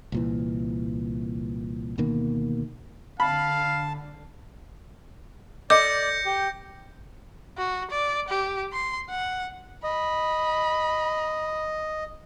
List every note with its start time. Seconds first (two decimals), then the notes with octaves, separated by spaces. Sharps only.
0.12 C2 A#2 E3
1.98 D2 B2 D#3 A#3
3.20 D3 F5 A5 B5
5.70 A4 D5 D#5 D6 G6 A#6 C#7
6.26 G4
7.58 F#4
7.91 D5
8.29 G4
8.73 C6
9.10 F#5
9.84 D#5 B5